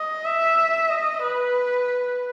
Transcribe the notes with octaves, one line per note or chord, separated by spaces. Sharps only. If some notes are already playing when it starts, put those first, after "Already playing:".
Already playing: D#5
E5
D#5
B4